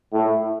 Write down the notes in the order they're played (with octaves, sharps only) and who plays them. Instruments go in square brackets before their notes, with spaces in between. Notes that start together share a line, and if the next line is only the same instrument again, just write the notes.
[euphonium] A2